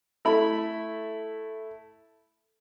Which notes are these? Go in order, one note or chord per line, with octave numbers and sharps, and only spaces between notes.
A3 E4 B5